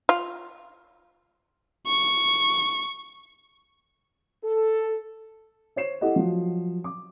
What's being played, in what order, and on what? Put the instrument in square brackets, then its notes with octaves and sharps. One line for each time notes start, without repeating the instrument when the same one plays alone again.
[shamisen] F4
[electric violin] C#6
[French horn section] A4
[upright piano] C5 C#5 C7 E7
E4 G4 A4 D#5 F#5
F3 F#3
D6